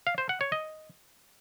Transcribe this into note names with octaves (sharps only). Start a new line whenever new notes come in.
F5
C5
F#5
C#5
D#5